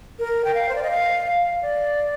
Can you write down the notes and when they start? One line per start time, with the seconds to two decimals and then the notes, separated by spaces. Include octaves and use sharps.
0.19 A#4
0.45 G5
0.54 F5
0.69 C5
0.75 D5
0.83 D#5
0.90 F5
1.27 F5
1.62 D5